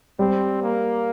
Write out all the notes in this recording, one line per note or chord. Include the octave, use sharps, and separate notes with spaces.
G3 C4
A#3